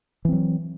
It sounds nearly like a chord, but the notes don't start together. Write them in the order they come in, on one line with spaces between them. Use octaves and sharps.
E3 C4 F#3